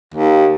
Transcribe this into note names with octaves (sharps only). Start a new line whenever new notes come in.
D#2